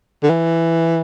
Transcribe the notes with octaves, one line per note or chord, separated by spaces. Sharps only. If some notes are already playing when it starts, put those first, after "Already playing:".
D3
E3